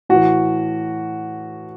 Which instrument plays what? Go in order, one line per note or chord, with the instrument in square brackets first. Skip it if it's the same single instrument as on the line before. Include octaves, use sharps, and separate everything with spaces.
[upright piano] A2 E3 F#4